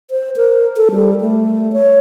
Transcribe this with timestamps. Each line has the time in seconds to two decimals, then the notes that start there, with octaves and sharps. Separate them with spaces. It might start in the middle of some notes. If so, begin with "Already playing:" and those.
0.11 C5
0.37 A#4
0.76 A4
0.91 G3
1.21 A3
1.73 C#5